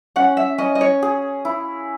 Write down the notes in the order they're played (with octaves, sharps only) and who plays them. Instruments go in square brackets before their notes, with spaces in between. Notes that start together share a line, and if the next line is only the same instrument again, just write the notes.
[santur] C#4 [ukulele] F#5
[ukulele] E5
[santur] C#4 [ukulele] D#5
[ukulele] D#5
C#5
[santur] G#4
E4